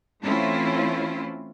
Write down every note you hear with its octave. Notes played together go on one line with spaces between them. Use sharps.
E3 A3 C4 C#4 E4 F4